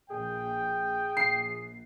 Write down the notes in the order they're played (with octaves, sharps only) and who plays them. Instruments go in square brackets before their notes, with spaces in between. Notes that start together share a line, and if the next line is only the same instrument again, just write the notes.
[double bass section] A#1 [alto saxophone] G#4 [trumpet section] G5
[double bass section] A#1 [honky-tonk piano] C7